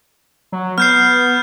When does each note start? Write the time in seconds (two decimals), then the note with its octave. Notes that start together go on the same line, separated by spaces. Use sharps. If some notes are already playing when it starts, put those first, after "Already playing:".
0.52 F#3
0.78 B3 F6 G6 C7